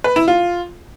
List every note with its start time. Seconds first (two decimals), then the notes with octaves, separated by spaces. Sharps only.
0.04 B4
0.16 E4
0.28 F4